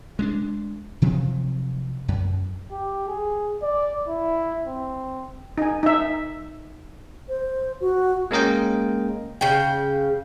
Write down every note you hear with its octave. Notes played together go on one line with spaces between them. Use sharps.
G#3 A#3 D4
C3 F3 F#3 C4
F#2
G4
G#4
D5
E4
C4
D#4 G#5
D#4 E5
C5
F#4
G#3 A#3 C#4 A#4 D#5 G5
C#3 G5